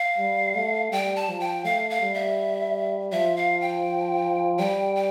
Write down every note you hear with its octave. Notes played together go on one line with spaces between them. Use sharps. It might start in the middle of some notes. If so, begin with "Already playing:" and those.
Already playing: F5
G3
A3
G3 G5
A5
F3
G5
A3 F5
F5
G3
E5
F3 E5
F5
G5
G3 G5
G5